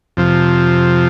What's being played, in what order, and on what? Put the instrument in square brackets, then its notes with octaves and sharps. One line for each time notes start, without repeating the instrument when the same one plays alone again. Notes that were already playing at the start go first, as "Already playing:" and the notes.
[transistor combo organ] F2 C3 F3